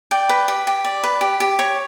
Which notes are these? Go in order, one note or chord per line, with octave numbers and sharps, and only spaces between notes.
D5 G5
B4
G4
G4
D5
B4
G4
G4
C#5 C#6